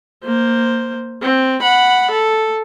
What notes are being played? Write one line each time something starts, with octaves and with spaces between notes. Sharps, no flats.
A#3 C5
C4
F#5 B5
A4